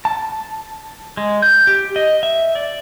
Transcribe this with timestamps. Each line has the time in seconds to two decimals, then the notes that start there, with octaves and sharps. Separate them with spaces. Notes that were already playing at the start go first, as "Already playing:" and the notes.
0.05 A5
1.17 G#3
1.42 G6
1.67 G4
1.96 D#5
2.23 E5
2.55 D5